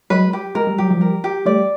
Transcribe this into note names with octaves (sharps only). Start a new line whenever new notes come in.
F#3 G#3 B4
G4
G#3 A#4
G3
F#3 G4
F3 G3
A#4
G4
G3 A3 D5